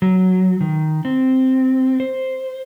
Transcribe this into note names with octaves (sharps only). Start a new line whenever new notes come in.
F#3
D#3
C4
C5